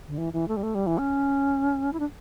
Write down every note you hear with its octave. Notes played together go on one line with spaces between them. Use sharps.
D3
E3
E3
A3
G3
A3
G3
E3
C#4
E4
D4